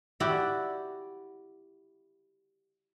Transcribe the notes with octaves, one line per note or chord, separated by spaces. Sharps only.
E4 F#4 G4 D5